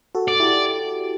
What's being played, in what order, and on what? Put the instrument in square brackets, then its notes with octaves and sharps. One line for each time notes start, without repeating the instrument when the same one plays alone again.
[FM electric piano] F#4 A4
[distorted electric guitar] D5
[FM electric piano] E4 G4